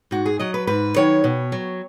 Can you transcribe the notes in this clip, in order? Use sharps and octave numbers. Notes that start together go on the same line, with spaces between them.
G#2 F#4
G#4
F#3 D#5
B4
G#2 B4
D#3 F#3 C#5
B2
F#3